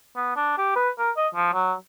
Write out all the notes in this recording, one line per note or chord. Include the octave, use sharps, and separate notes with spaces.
B3
D4
G4
B4
A#4
D#5
F3
F#3